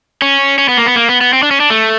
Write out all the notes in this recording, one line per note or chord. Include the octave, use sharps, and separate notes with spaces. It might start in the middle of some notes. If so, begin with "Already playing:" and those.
C#4
C#4
B3
A#3
B3
A#3
B3
B3
C4
D4
C#4
D4
A3